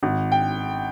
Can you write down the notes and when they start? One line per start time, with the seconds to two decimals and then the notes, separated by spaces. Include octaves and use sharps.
0.03 G#1
0.32 G5